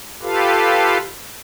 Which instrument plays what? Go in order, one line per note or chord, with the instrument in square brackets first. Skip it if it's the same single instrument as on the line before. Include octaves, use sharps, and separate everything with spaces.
[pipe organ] F4 G4 A4 B4 F5